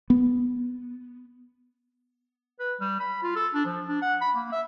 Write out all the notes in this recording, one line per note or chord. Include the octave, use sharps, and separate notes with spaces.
B3
B4
G3
B5
F4
A4
D4
F3
D4
F#5
B5
A#3
E5